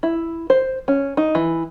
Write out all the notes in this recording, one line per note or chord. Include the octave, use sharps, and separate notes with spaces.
E4
C5
C#4
D#4
E3